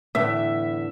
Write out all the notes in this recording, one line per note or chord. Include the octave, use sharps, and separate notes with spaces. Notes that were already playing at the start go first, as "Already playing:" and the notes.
E2 A2 D3 E5